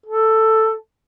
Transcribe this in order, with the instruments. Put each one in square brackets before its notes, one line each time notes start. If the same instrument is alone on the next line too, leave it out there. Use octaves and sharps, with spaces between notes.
[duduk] A4